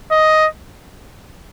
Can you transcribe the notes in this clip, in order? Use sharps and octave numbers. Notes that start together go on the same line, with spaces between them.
D#5